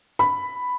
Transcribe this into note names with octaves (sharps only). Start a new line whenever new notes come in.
B5